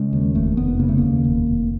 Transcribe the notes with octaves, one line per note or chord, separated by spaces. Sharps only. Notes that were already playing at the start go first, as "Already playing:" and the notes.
Already playing: C#3 G#3
D#2
F1 A3
F1 B3
C#3 A#3
A3
D#2 A#3
F1
F1